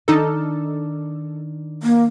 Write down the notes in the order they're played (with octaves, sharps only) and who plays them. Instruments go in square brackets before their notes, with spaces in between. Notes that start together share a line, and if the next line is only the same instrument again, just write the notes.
[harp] D#3 D4 F6 [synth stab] D#4 A4
[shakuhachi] A#3